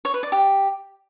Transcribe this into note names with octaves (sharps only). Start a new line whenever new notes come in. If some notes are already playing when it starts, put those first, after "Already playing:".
C#5
B4
D5
G4